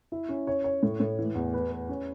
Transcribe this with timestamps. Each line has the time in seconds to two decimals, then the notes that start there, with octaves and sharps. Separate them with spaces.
0.12 E4
0.29 C#4
0.47 C#5
0.64 C#5
0.83 A2
1.00 A2
1.19 E3
1.35 E2
1.53 B4
1.71 B4
1.89 C#4